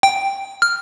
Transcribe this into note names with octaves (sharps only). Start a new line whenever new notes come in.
G5
F6